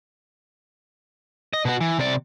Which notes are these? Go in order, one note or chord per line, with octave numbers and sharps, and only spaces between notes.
D#5
B2 F#4
E3
C3 D5